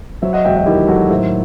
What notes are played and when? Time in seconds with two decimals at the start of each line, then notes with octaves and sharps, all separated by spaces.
0.22 F#3 C5 E5
0.33 D#5 F#5
0.45 E1 E5 G5
0.56 D#5 F#5
0.66 D#3 E4 G4
0.88 F#3 F#4 A4
1.10 A2 C5 E5